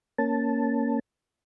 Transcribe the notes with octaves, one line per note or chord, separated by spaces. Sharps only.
A#3 C#4 A5